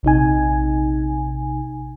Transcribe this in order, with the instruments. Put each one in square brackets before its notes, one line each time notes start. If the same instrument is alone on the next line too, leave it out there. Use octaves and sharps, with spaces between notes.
[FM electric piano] A#1 C3 D#4 G#5